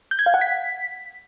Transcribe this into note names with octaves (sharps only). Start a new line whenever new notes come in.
G6
G#6
F5
F#5
B6